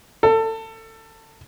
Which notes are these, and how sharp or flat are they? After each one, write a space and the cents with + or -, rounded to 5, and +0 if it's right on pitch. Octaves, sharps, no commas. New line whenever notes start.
A4 +25